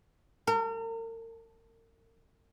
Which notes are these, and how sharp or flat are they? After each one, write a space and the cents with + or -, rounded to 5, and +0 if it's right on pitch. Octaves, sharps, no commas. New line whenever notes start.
A#4 -40